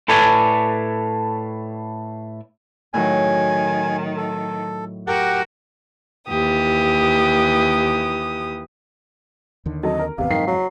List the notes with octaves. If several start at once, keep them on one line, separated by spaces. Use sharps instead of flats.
A2 A4 B4 C#5 D5 G#5
A2 D#3 F#3 G#5
A4
F#4 G4 A#4 F#5
D#2 E3 G4 D#6
D#2 D3 D#3
F#3 C4 A4 D#5
A#4
G#1 E2 C3 B3 F5
F#1 F2 G#2 D#3 B6 C7
F#3